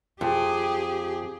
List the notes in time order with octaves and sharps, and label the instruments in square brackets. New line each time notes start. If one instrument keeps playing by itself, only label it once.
[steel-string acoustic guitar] F2 [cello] G4 G#4